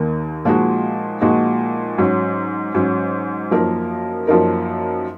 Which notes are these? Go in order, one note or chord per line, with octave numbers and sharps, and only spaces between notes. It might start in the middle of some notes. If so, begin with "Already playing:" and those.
Already playing: D#2 D#3 A#3
A#2 F3 G#3 D#4 F#4
A#2 F3 G#3 D#4 F#4
G#2 F#3 C#4
G#2 F#3 C#4
F#2 F3 A#3 D#4 A#4
F#2 F3 A#3 D#4 A#4